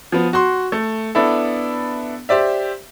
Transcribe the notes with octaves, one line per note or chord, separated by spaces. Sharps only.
F3 B3
F#4 C6
A3
B3 D4 E4 A4
G4 C5 D5 E5